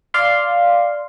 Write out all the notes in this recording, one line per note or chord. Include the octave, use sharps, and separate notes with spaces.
D5 F5 C6